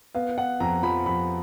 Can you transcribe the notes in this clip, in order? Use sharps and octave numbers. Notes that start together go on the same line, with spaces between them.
B3 F5
B3 F#5
F2 A#5
F3 B5
F2 B5